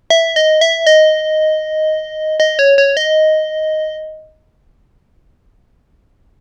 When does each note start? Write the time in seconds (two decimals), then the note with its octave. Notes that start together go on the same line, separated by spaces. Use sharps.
0.10 E5
0.36 D#5
0.61 E5
0.87 D#5
2.40 D#5
2.59 C#5
2.78 C#5
2.97 D#5